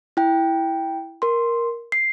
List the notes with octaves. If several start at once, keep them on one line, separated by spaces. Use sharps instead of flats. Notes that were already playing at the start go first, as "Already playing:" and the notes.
E4 G5
A#4 C6
C7